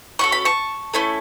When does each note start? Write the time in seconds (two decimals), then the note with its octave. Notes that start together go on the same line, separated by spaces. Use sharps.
0.19 C#4 F#4 A4 C#6
0.32 B5
0.45 A5 C#6
0.94 A3 C#4 E4 A4